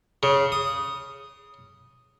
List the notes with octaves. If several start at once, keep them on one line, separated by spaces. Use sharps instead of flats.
C#3
D#6